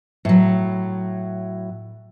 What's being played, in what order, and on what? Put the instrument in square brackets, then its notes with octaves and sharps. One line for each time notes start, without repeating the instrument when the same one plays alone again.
[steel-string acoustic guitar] A2 F#3